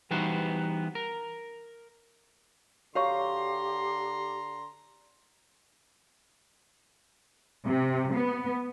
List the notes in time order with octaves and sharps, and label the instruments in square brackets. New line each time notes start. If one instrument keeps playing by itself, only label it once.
[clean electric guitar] E3 G3 B3 D#4 F#4 C5
A#4
[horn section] D3 A#5 C6 [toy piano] F#4 C#5 C#6 [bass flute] G4 [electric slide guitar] F5
[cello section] C3
B3